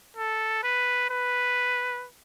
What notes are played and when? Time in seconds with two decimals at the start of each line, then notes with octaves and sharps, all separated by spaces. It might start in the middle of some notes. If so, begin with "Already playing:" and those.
0.17 A4
0.63 B4
1.10 B4